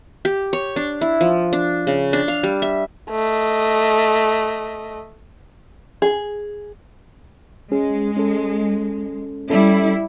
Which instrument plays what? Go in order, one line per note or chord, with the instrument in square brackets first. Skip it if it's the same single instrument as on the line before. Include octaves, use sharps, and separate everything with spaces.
[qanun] G4
C#5
D4
E4
F3
D4
C#3
D4
F5
G3
E5
[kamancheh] A3 D#5
[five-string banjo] G#4
[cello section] G#3 [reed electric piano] C#4 G#4
[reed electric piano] C#4 A4
[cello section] G3 E4 [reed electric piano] C#4 A4